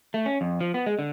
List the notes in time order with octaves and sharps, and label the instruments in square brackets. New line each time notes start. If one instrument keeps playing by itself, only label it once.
[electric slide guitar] A3
C#4
F2
F3
B3
G#3
D3